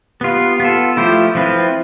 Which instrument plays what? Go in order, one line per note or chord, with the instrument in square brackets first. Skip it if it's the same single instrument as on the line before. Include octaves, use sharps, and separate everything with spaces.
[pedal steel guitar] B3 F4 B4 [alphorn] G4
[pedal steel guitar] B3 F4 A4
[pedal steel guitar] F3 A3 E4 G4 C5 [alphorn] F4
[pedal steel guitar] F3 C4 F4 B4 [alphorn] E4